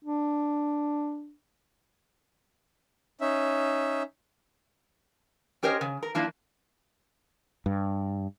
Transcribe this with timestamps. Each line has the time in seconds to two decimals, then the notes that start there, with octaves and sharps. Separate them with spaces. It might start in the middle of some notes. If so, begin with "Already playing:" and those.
0.05 D4
3.21 C#4 D#4 E5
5.63 C#4 G4 A#4 C5 C#5 D#5
5.81 C#3
6.03 A#4
6.15 F3 A#3 D4 E4
7.66 G2